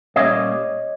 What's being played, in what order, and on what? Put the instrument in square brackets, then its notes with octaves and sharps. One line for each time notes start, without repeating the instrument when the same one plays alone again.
[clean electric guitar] A#2 G3 A#3 C#4 C#5 D#5